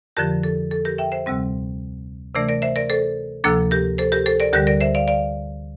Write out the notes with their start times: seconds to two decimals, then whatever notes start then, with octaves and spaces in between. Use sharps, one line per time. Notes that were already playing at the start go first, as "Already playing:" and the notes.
0.17 F2 D3 F3 G4 A#4
0.43 A4
0.71 A4
0.85 G4 A#4
0.98 E5 G5
1.12 C5 E5
1.26 D2 C3 G3 C4
2.35 C3 E3 A3 D4 A#4 D5
2.49 A#4 D5
2.62 C5 E5
2.76 A#4 D5
2.90 A4 C5
3.44 D2 C3 F3 A#3 D4 A4
3.71 G4 A#4
3.98 A4 C5
4.12 G4 A#4
4.26 A4 C5
4.40 A#4 D5
4.53 D2 D3 G3 G4 A#4
4.67 A#4 D5
4.81 C5 E5
4.95 D5 F5
5.08 D5 F5